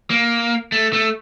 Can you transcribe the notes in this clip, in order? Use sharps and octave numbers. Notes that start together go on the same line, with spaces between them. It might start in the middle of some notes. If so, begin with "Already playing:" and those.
A#3
A3
A3